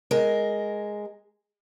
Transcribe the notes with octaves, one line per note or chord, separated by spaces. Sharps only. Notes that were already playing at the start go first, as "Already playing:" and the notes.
G#3 A#4